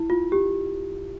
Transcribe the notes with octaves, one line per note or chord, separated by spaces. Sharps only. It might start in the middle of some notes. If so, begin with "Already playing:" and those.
Already playing: E4
F4
G4